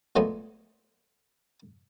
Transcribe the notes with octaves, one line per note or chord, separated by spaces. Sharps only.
A#2 F#3 G#3 A3 B3